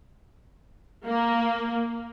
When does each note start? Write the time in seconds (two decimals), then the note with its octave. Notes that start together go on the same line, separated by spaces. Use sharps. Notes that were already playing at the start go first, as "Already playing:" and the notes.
1.06 A#3